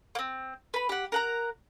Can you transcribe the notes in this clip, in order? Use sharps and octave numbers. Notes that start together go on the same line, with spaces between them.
A#3 C4
B4 B5
G4 F#5
A#4 F#5 A#5